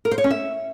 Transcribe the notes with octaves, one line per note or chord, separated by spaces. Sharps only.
A#4
C5
C#5
C#4
E5